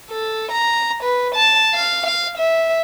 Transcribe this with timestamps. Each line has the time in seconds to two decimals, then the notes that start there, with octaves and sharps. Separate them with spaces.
0.10 A4
0.52 A#5
1.03 B4
1.35 A5
1.74 F5
2.06 F5
2.38 E5